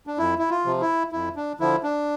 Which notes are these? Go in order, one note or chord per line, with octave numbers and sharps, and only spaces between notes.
D4
F2 E4
E4
F4
C3 F3
E4
F2 E4
D4
D3 F3 E4
D4